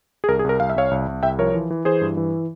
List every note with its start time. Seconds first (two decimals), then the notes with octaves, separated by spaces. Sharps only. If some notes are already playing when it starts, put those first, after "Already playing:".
0.24 G#4
0.28 C2 A#4
0.39 G#4
0.44 C2 A#4
0.60 C2 F5
0.70 E5
0.76 C2 C#5 F5
0.91 C2
1.08 C2
1.23 C2 E5 G5
1.38 F3 A#4 C#5
1.54 E3
1.70 E3
1.85 E3 G#4 C5
2.01 G2
2.17 E3